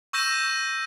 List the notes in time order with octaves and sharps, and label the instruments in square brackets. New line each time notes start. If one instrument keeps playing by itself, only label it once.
[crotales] C#6 E6 G6 A#6 D#7 E7